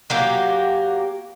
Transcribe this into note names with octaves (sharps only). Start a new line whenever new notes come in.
F#3 A#3 G4